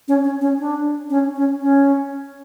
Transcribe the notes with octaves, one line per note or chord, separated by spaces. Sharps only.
C#4
C#4
C#4
D4
C#4
C#4
C#4